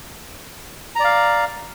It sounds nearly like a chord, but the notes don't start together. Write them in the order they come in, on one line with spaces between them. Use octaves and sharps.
A#5 D5 F5